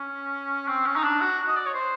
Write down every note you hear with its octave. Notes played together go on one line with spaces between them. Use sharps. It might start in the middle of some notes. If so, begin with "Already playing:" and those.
Already playing: C#4
C4
C#4
D#4
D4
F#4
D#5
D5
C#5
C5